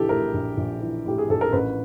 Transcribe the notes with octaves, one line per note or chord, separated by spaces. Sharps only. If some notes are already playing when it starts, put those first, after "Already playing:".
Already playing: A#1 E3 G4 A4
A2 A#4
A#1
A#1
E3
A2 G4
G#4
A#1 A4
A#4
A1 B4